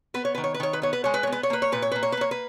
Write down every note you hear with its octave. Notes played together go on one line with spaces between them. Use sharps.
B3 B4
C#5
D#3 B4
C#5
B4
D#3 C#5
B4
B3 C#5
B4
G#3 C#5
B4
C#5
B3
B4
C#5
A#3 B4
C#5
A#2 B4
C#5
A#3 B4
C#5
B4
A#3 C#5
B4